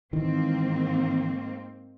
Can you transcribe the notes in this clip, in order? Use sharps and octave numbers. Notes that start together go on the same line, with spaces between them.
G#2 D#3 E3 A#3 C4